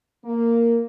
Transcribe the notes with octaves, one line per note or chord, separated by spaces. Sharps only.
A#3